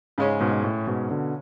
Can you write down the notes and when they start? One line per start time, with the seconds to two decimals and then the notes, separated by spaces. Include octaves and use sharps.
0.18 G#2 C#3 G#3 C#4
0.40 G#2 B2
0.53 B2
0.64 A2
0.87 G#2 B2
1.10 B2 D3